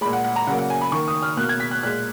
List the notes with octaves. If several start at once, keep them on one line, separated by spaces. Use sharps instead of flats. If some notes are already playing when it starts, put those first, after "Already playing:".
A#2 G#3 B5
F#5
F#5
A#5
C#3 F#3 A#3 F#5
F#5
G#5
B5
D#3 A#3 C#6
D#6
F6
B2 A#3 F#6
G#6
B6
F#6
A#2 G#3 F#6